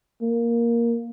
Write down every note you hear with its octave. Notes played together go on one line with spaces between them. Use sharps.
A#3